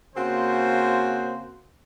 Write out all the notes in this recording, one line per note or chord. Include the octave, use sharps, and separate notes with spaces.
C#3 A#3 C4 F#4 C5